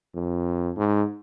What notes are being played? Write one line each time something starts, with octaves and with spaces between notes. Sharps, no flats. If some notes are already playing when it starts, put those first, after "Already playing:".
F2
G#2